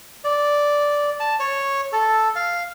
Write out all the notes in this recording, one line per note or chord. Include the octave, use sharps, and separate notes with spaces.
D5
A5
C#5
A4
F5